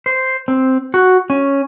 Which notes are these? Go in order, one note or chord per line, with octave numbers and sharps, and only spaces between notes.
C5
C4
F#4
C#4